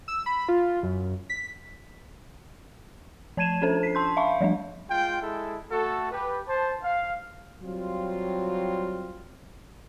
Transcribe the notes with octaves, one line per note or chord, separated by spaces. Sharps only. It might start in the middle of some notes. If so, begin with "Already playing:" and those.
E6
B5
F4
F#2
B6
F3 A5 G#6 D#7 E7
C#4 D4 A4 C5
B6 C7
A5 C6 G6
E5 F5 B5 C#6
F3 G3 A3 D4
G#3 F4 G5
G#3 E4 G#4 A4
A3 F#4 A4
G4 B4
C5 A5
F5
F#3 G3 C4 F4